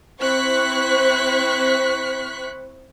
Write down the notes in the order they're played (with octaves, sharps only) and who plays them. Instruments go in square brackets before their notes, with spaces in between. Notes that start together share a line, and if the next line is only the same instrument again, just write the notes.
[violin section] C4 E4 C5 C#6 F#6 B6